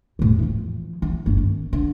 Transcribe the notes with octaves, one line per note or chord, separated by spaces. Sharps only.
E2 A2
E3 F3
E3
G1 C#4
D#3
D3